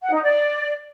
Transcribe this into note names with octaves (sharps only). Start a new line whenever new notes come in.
F#5
D#4
D5